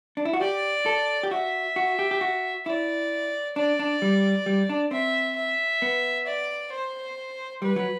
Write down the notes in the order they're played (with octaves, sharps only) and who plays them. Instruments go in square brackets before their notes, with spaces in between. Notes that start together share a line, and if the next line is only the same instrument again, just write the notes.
[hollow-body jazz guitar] D4
E4
F#4
[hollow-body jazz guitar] G4 [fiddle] D5
[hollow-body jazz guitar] A4
G4
[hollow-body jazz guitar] F#4 [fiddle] E5
[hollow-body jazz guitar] F#4
G4
G4
F#4
[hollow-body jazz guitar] E4 [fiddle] D5
[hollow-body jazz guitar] D4 [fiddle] D5
[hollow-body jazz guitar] D4
G3
G3
D4
[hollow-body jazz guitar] C4 [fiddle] E5
[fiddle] E5
[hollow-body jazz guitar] B3
[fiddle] D5
C5
[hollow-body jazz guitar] G3 [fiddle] B4
[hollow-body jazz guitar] F#3